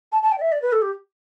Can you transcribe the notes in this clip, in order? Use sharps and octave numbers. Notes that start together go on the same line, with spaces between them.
A5
A5
G5
D5
E5
D5
B4
A4
G4